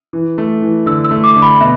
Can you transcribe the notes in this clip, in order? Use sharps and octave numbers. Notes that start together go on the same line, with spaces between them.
E3
A3
E3
D3 E6
E6
A3
D6
D3 D6
B5
B2 E5